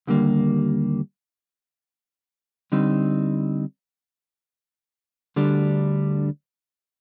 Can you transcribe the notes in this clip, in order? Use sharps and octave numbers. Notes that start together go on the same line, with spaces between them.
D#2 D3 G3 A#3
D3 G3 C4 D#4
D2 D3 G3 D4